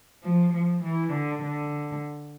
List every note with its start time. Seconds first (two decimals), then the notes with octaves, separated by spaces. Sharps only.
0.24 F3
0.53 F3
0.84 E3
1.13 D3
1.43 D3